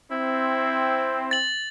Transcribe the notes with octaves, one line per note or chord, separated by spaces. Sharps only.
C4 E4
A6 F#7